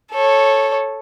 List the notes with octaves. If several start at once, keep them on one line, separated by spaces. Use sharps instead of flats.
A4 C#5